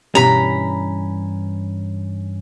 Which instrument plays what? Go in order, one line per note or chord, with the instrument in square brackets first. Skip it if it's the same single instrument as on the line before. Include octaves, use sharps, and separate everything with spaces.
[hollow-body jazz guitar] G2 E3 C#4 [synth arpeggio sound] B2 G4 [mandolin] A#5 B5